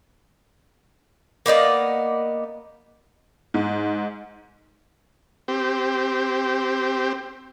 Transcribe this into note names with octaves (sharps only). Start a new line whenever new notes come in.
A#3 B3 D#4 D5
G#2
C4 G4